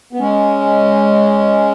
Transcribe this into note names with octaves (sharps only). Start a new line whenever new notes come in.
B3
G#3 C#4